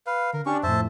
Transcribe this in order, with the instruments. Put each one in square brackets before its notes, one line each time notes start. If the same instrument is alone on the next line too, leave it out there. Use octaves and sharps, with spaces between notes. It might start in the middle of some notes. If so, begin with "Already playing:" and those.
[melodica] B4 F5
[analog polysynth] D3 [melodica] A#4
[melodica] C#4 G4 C#6 [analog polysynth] D4
[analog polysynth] F2 A2 [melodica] C5 E5 A5